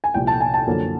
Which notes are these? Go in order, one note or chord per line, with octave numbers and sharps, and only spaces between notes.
G#5
C2 A#2 F3 G5
A5
G#5
A5
F#2 D3 F3 A#3